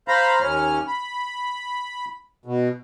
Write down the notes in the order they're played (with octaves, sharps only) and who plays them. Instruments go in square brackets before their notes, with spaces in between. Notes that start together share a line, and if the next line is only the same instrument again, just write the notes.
[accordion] C5 F5 A#5 B5
D#2 C#4 F6
B5
B2